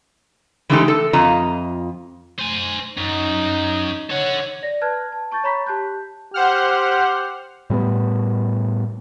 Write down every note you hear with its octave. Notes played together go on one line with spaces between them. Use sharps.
E3 G#3 A3 D#4 G4 A4
A4
F2 F4 D#5 A#5
C5 G#5
F#2 D#4
A4 C#5 F#5
D5 A#6
B4 A5 F6 F#6 G#6
A5
A5 C#6 G6 A6
C#5 A#5 B5 C#6 B6
G4 A5 F#6 G6
G4 C5 F#5 F6
A2 G3 A3 B3